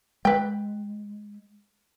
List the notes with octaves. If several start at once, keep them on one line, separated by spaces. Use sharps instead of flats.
G#3 B4 G5